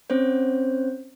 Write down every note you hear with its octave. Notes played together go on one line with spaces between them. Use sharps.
C4 C#4 C5 C#5